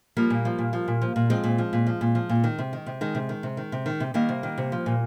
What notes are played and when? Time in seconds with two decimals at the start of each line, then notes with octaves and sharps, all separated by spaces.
0.17 F3 G3 A#3
0.30 A#2
0.45 F3
0.59 A#2
0.73 F3
0.88 A#2
1.02 F3
1.16 A#2
1.30 F3 G#3 C4
1.44 A#2
1.58 F3
1.73 A#2
1.87 F3
2.01 A#2
2.15 F3
2.29 A#2
2.44 D#3
2.59 C3
2.73 D#3
2.86 C3
3.01 D#3 G#3
3.15 C3
3.29 D#3
3.43 C3
3.57 D#3
3.72 C3
3.86 D#3
4.00 C3
4.14 D#3 G3 A#3
4.29 C3
4.43 D#3
4.58 C3
4.72 F3
4.86 A#2